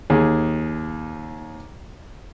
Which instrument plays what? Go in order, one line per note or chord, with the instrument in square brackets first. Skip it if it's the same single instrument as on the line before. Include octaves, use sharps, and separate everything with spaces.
[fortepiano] D#2 G#4